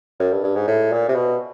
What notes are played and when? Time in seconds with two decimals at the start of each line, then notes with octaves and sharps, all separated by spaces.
0.20 F#2
0.32 G2
0.44 G2
0.56 G#2
0.68 A2
0.92 A#2
1.08 C3
1.16 B2